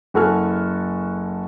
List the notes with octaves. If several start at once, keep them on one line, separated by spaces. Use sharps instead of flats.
F#1 F#4 A4 G#5 F6